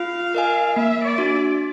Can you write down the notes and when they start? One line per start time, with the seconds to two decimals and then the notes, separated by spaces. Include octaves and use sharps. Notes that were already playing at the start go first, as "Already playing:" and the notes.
Already playing: F4 F5
0.35 A#4 D#5 G#5
0.76 A#3 E5
1.04 D5
1.18 D4 F#4